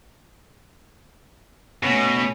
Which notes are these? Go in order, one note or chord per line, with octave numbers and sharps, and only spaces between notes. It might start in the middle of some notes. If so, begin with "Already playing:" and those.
B2 A3 C#4